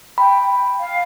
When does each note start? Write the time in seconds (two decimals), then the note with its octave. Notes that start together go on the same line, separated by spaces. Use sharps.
0.18 G5 B5
0.80 F5